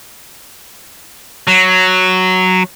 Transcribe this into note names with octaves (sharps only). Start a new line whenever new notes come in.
F#3